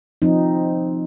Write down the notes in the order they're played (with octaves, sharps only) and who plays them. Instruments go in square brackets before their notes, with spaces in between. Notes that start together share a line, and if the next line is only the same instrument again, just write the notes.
[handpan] F3 C4 D#4